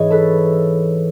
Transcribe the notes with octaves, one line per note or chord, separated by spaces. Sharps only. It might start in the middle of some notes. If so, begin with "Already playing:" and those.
Already playing: G#2 E3 C#5 D#5
A4 B4